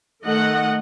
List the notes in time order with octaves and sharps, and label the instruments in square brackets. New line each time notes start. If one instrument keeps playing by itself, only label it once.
[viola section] D#3 A3 D#5 F#5